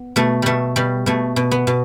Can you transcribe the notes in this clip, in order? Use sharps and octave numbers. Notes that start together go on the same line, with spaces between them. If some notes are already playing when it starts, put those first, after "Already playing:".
Already playing: B3
B2 A3
B2 G3 A3
B2 G3
B2 A3
B2
B3
B2